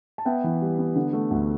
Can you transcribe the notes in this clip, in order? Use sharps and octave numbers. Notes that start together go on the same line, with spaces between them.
A5
B3 E5 G5
E3
G3
B3
D3
A3
D2